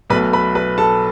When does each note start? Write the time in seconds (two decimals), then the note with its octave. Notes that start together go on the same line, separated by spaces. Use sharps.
0.10 B1 B2 A3 B4 B5
0.33 B4 B5
0.55 B4 B5
0.78 A4 A5